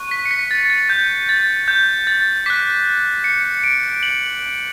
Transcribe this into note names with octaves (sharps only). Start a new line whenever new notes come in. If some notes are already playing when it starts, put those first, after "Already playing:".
Already playing: C#6 F#6
B6
C#7
B6
A6
A6
G6
A6
G6
A6
D6 F#6 B6
C#7
D7
F#7